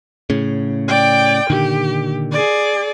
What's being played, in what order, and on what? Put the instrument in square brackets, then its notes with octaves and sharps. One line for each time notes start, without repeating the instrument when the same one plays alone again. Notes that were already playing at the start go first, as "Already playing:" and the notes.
[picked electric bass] A2 C#3
[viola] D5 G5
[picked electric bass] A#2 D3 D#3 [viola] G4
[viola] G#4 D5